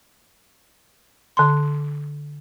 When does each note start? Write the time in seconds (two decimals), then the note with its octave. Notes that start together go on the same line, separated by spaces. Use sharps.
1.37 D3 C6